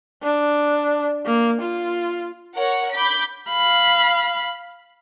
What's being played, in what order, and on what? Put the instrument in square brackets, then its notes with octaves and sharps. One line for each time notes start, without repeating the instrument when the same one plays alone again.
[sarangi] D4
A#3
F4
[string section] A#4 C#5 F#5
B5 D6 G6 B6
[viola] F5 B5